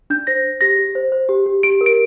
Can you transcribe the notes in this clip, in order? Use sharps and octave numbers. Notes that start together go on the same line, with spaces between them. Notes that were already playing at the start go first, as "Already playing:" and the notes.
D4 G6
C5 A#6
C5
G4 A#6
G4
C5
C5
G4
G4
G4 D7
A#4
D7